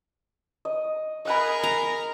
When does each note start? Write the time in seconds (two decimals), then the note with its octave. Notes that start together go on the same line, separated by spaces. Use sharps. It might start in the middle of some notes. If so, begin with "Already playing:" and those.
0.65 D#5
1.25 G#4 A#4 D#5 F#5 B5
1.64 A#5